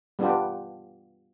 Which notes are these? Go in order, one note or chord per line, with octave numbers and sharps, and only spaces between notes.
G3 B3 D4 F4 G4